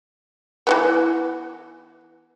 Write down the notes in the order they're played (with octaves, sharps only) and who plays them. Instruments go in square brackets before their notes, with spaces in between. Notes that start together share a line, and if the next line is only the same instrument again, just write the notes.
[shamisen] E3 A3 B3